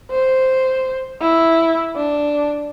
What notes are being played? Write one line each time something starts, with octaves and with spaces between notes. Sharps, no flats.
C5
E4
D4